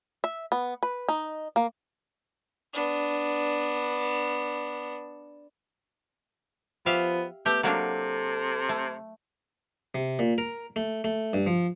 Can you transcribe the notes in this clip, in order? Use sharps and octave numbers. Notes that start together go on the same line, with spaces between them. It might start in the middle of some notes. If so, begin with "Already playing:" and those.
E5
B3
B4
D#4
A#3
B3 D4
F3 B3 G4 E5 F5
A3 B3 G4
C3 F#3 A#3 D4 A4
A3
C3
A#2
A#4
A3
A3
G2
F3